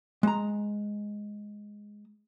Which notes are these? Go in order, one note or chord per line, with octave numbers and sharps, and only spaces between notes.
G#3 A#5